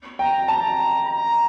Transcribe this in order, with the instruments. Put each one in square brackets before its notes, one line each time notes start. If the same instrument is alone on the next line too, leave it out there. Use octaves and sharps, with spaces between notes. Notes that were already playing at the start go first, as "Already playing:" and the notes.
[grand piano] G5 [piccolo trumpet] A#5
[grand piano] A5 [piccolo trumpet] A#5
[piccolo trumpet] A#5